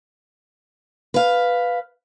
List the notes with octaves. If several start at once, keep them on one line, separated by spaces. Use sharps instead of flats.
B4 F5